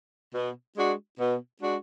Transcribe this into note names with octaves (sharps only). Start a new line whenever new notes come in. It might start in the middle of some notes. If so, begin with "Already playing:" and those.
B2
G#3 D4 F#4
B2
G#3 D4 F#4